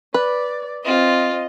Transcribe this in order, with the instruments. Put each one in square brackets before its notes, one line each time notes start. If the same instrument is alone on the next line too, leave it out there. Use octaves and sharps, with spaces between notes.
[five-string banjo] B4 [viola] D5
[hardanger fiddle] C4 F4 [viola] D#5